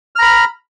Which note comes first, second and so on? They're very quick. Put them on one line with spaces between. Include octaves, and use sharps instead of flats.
F6 A#5 B5